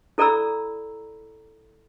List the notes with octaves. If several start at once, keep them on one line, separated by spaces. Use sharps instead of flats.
E4 A4 D5 A#5 B5 E6